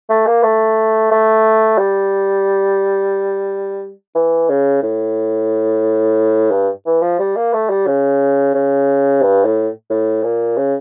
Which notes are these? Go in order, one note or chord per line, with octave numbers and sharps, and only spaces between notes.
A3
A#3
A3
A3
G3
E3
C#3
A2
G2
E3
F3
G3
A#3
A3
G3
C#3
C#3
G2
A2
A2
A#2
C#3